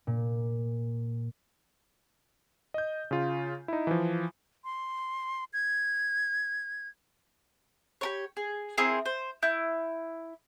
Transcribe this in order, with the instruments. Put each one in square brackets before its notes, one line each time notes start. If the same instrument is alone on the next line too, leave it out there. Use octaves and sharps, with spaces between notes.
[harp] A#2
[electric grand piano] D#5 G6
C#3 F4
D#4 E4
E3 F3
[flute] C6
G#6
[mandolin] G4 A#4 C#5
G#4
C4 E4 G#4 A#4
C5
E4 G6